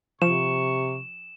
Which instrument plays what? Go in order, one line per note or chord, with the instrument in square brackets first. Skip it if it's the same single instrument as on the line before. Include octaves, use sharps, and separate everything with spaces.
[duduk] C3 [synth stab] F3 [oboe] C#6 [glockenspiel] E7